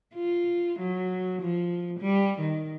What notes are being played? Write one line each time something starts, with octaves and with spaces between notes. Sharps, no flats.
F4
F#3
F3
G3
D#3